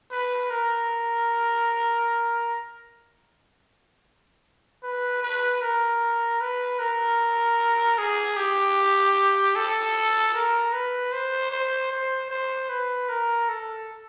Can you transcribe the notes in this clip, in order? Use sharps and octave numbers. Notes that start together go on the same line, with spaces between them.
B4
A#4
B4
B4
A#4
B4
A#4
G#4
G4
A4
A#4
B4
C5
C5
C5
C5
B4
A#4
A4